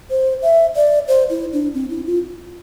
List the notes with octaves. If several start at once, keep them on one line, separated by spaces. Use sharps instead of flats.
C5
E5
D5
C5
E4
D4
C4
E4
F4